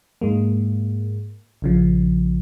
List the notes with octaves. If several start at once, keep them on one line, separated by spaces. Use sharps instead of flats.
G#2 G#3 A#3
A#1 C#3 F3